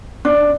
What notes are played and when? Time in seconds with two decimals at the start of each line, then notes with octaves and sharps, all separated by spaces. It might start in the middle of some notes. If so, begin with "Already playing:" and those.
0.25 D4